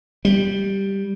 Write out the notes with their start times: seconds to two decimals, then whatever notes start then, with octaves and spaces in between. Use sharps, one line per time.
0.25 G3